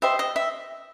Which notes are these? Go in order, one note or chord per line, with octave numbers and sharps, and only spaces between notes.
G4 C5 D#5 E5
D#5
E5